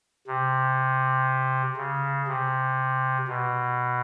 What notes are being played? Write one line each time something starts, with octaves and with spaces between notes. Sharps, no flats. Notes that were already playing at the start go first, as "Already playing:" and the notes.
C3
C#3
C3
B2